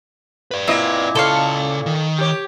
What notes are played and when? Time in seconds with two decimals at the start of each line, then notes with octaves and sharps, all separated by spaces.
0.51 B4 D5
0.68 A#2 C4 E4 D#5
1.15 C#3 A4 C#5 F5 C6
1.86 D#3
2.18 G4 C#5